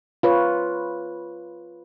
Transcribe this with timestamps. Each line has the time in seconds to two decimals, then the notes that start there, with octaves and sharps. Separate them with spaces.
0.23 F4 B4 C#5